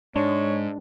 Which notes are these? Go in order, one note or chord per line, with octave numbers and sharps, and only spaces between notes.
G#2 G#3 D4 C#5